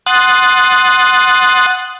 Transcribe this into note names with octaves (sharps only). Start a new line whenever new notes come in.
F#5 C6 D#6 F#6 A6